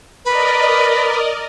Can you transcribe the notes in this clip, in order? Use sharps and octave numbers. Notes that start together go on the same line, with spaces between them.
A#4 B4 D5 D#5